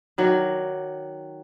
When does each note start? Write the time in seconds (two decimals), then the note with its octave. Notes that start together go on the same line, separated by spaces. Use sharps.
0.18 D#3 F#3 D5